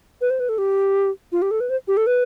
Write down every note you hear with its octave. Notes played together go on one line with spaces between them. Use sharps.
B4
C5
B4
A4
G4
F4
G4
A4
B4
C5
G4
A4
B4